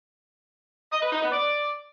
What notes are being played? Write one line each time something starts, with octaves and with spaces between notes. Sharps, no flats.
D#5
B4
D#4
B3
D5